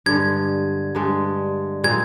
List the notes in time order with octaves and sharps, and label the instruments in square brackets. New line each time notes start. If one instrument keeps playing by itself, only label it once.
[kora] G2 D3 G#3 [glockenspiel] G#6
[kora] G2 D3 G#3
[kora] A#2 G#3 C4 [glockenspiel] G#6